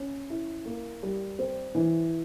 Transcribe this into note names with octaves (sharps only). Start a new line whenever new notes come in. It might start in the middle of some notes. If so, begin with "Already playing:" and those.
Already playing: C#4
E4
A#3
G3
C4
E3